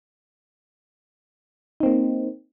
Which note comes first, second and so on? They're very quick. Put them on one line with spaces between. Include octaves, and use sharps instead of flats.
D#4 C4 A#3